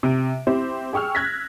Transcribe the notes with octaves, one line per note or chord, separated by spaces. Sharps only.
C3 D7
C4 E4 G4
G#4 G5 C#6 E6 F6
F#6 G#6 A#6 B6